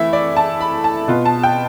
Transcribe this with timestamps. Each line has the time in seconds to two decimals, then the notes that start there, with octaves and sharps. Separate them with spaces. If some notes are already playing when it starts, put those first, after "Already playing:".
Already playing: E3 A3 E4 E5
0.13 D5
0.37 A5
0.61 B5
0.84 A5
1.08 B2 B3 F4
1.25 A5
1.43 G5